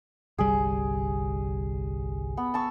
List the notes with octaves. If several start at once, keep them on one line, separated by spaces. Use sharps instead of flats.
G1 C2 G3 G#4
B3
A5 C#6 E6